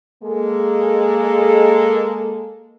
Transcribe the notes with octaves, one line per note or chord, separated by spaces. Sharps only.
G#3 A#3 A4